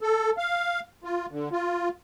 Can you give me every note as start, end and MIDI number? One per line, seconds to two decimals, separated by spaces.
0.01 0.30 69
0.38 0.80 77
1.04 1.26 65
1.31 1.49 50
1.52 1.89 65